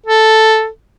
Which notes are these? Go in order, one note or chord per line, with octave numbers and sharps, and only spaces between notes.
A4